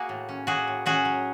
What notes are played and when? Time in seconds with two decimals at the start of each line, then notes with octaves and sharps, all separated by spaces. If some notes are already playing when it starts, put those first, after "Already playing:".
Already playing: A#3 F#4 G#4
0.09 A2
0.29 C#4
0.47 A#3 F#4 G#4
0.68 A2
0.86 C#4 F#4 G#4
1.05 F#3